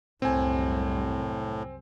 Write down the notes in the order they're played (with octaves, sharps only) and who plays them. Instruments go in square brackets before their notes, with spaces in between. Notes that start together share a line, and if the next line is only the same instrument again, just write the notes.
[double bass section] C2 F#2 [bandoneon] A2 [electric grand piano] C4 G#5